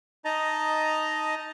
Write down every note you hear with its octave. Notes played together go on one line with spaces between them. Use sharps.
D#4 D#5 A5 A#5